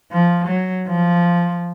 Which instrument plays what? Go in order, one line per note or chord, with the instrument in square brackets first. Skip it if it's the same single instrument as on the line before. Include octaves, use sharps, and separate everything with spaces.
[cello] F3
F#3
F3